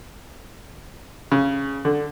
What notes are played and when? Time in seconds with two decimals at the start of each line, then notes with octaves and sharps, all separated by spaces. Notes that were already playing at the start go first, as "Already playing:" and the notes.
1.32 C#3
1.85 D3